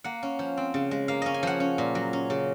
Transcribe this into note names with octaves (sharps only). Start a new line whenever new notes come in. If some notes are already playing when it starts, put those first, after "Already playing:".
A#3 F#5
C#4
F3
C4
C#3
G#3
A#3 F5
C#4 D#5
G#5
F3 F#5
C#4
A#2
F#3
C#4
C#3